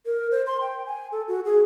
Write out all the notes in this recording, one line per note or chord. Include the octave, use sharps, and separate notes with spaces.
A#4
C5
C6
G5
G#5
A4
F#4
G#4